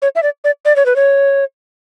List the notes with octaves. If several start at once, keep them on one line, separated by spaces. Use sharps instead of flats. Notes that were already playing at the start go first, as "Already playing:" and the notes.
C#5
E5
D5
D5
D5
C#5
B4
C#5